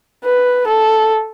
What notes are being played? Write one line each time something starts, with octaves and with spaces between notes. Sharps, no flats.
B4
A4